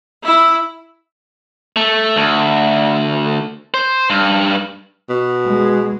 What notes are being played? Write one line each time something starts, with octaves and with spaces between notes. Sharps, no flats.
E4
A3
D2
C5
G2
B2
G#3